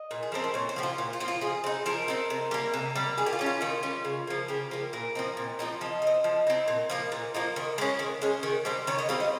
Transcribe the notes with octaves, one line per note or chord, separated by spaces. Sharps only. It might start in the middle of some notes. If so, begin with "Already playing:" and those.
Already playing: D#5
A#2
G#4
F3 C4 A#4
C5
A#2 C#5
C5
F3 C4 G4
F4
A#2
F4
F3 C4
F4
F3 G#4
C4 D#4
F3 A#4
C4 D#4
C3
G3 A#3
C3
G3 A#3
D#3 G#4
G4
F4
G3 C#4
F4
D#3 F4
G3 C#4
C#3
F3 A#3
C#3 G4
F3 A#3
A#2 A#4
F3 C4 D#4
A#2
F3 C4 D#4
F3 D#5
D#4
C4
F3
C4 D#4
A#2
F3 A#3 D#4
A#2
F3 A#3 D#4
D#3
G#3 C#4
D#3
G#3 C#4
D#3
G3 C4 D#4
D#3 C#5
D#5
G3 C4 D#4 F5
D#5